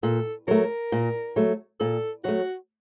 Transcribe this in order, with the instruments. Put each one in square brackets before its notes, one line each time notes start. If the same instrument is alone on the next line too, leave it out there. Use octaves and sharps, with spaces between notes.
[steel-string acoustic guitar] A#2 [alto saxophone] A4
[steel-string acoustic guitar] F#3 A3 [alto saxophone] A#4
[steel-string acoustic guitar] A#2
F#3 A3
[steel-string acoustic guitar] A#2 [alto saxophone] A4
[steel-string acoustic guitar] F#3 A3 [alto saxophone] F#4